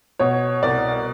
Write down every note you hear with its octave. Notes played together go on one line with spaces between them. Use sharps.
B2 C#5
C2 D5